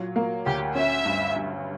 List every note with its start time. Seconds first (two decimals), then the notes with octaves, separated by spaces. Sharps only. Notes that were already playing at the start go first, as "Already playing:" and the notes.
Already playing: A#2 F#3
0.16 A#3
0.46 D2 G4
0.75 C#4 E5
1.06 G2
1.36 G2